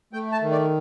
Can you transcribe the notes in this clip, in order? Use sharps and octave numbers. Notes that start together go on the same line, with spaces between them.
A3 G5
A5
D#3
D5